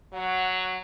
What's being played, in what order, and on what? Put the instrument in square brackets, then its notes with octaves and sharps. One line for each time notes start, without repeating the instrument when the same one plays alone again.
[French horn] F#3 [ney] F#5